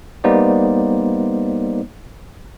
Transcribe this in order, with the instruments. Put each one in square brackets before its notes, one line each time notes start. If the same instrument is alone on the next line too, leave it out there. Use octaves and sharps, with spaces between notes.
[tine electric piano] G3 A#3 B3 D#4 C5 D5